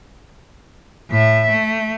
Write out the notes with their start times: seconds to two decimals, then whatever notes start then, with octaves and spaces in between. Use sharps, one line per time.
1.11 A2 E5
1.51 A3